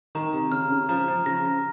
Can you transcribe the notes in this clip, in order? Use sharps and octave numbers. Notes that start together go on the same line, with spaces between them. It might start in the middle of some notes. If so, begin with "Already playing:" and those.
D#3 A#5
C3
C#3 F6
C#3
F3 A#5
F3
C#3 A#6